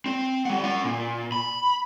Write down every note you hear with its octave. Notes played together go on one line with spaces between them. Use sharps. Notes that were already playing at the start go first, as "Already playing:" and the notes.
C4
G3 F#5
C#4 F#5
A#2
B5